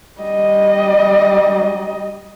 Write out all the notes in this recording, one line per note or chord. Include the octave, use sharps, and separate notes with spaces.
G3 D#5